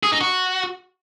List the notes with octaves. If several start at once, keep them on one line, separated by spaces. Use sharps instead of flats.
G#4
D#4
F#4